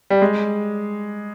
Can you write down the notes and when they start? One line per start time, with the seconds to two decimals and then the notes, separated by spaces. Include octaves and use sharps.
0.10 G3
0.22 G#3